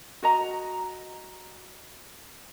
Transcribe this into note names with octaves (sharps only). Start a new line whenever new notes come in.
F#4 D#5 A#5